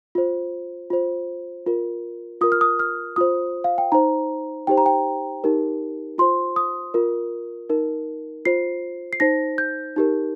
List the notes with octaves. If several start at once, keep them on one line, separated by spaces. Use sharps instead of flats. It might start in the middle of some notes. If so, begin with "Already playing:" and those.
F4 C5
F4 C5
F4 A#4
F4 A#4 D#6
F6
D#6
F6
F4 C5 D#6
F5
G5
D#4 C5 A#5
D#4 G4 C5 G5
A#5
G5
D#4 G4 A#4
F4 C5 C6
D#6
F4 A#4
D#4 A#4
F4 C5 C7
C7
D#4 C5 A#6
G6
D#4 G4 A#4